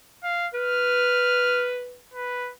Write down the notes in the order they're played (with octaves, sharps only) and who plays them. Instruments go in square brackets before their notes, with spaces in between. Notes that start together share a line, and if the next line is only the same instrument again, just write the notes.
[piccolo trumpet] F5
[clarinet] B4 [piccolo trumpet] F6
[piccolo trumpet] B4